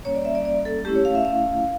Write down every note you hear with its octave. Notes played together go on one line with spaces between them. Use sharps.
G3 A#3 C#4 C#5
D5
E5
D5
D5
A4
A3 C#4 E4 G4
C#5
F5
E5
F5